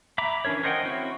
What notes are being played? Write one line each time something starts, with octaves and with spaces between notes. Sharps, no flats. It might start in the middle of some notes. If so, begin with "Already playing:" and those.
E5 A#5 B5 D6
E3 C#4 D4 A#4 C#5
A#4 C5 D#5 F#5 G5
C4 C#4 E4 F#4 C#5